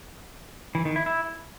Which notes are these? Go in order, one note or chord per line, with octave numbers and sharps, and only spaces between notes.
E3
D#3
E4
E4